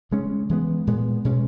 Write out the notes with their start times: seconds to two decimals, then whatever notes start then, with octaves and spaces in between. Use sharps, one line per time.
0.11 C#3 G#3 C#4
0.49 E3 G#3 B3
0.87 A#2 G#3 B3
1.25 B2 G#3 C#4